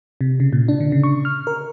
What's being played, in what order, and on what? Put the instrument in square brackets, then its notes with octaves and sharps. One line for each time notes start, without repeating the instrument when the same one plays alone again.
[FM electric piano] C3
C#3
A#2
D4
D3
C#3
C#6
F6
A#4